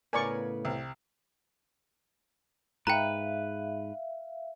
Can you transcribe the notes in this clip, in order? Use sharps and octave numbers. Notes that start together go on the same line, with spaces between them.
A2 C#3 B3 A#4 D5 G#5 C#6
C2
G#2 B4 E5 F5 G5 A#5